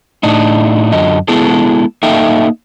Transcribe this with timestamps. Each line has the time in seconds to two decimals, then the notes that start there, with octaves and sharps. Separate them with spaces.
0.23 A2 D4 D#4
0.92 F#2 D3 D#5
1.28 G#3 B3 E4 G#4 A4
2.03 A#3 D#4 A4 E5 F5 G5